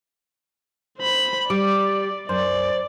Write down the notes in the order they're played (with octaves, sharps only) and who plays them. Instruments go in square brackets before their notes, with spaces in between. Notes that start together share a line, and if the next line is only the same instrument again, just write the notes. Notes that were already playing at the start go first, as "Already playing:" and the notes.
[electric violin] C5 B5
[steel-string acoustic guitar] G3 [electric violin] D5 [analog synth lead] D6
[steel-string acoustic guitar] F#2 [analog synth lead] C5 [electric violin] D5